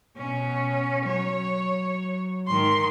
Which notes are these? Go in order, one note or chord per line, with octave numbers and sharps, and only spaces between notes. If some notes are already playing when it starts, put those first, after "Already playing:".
B2 C#4
F#3 C#5
G#2 D#3 C6